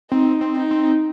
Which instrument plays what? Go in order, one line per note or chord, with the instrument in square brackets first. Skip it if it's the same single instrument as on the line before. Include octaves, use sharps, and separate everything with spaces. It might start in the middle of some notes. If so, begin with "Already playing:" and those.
[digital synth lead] C4 [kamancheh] D#4
[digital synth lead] C4
[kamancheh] D#4
[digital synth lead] C4